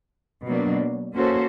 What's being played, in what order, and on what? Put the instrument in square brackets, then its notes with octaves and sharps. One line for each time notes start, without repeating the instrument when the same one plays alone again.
[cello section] B2 F#3 A#3 D4
A#3 C#4 F#4 A4 C5